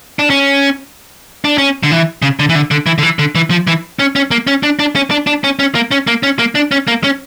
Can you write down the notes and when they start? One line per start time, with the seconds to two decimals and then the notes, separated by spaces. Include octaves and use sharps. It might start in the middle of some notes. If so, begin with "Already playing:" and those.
0.19 D4
0.30 C#4
1.44 D4
1.58 C#4
1.83 D3
1.91 E3
2.22 C#3
2.39 D3
2.49 E3
2.55 D3
2.71 D3
2.86 E3
2.98 D3
3.03 E3
3.19 D3
3.35 E3
3.50 F3
3.67 E3
3.99 C#4
4.16 C#4
4.31 A#3
4.47 C#4
4.63 D4
4.79 D4
4.95 C#4
5.11 D4
5.27 D4
5.44 C#4
5.59 C#4
5.75 A#3
5.91 C#4
6.07 A#3
6.23 C#4
6.39 A#3
6.55 D4
6.71 C#4
6.87 A#3
7.04 C#4